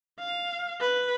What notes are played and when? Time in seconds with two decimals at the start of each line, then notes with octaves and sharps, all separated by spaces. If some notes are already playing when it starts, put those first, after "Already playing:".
0.19 F5
0.80 B4